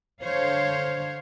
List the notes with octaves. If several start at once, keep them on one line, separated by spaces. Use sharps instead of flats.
D3 C5 C#5 F5